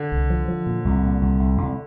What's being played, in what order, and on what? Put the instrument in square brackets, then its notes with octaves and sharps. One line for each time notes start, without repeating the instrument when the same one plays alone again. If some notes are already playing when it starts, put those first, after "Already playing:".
Already playing: [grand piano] D3
[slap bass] C2
F3
F3
A#2
C2
A#2
C2
C2
C2